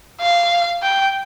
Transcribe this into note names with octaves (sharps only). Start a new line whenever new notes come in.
F5
G5